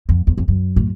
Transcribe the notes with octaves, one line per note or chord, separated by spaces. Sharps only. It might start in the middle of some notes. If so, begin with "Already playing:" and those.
F2
E2
F2
F#2
A2